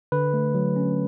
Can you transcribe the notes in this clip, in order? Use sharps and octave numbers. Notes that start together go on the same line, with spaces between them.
D3 B4
A3
F#3
C#4